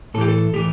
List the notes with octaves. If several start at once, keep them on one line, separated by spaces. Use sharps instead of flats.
A2 E3 G4 A4
A4
A2 E3 G4